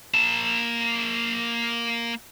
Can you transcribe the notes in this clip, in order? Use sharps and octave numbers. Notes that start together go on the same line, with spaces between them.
A#3 A5